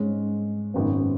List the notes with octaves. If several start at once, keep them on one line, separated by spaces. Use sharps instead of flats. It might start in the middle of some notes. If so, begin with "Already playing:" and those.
Already playing: G#2 G#3 C#4
G#1 F#2 C#3 B3